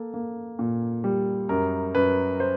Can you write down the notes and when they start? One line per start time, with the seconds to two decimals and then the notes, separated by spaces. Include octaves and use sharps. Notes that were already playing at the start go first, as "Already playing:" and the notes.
Already playing: A#3 A4
0.14 A#3
0.59 A#2
1.04 G3
1.49 F#2 A#4
1.95 F#2 B4
2.40 C5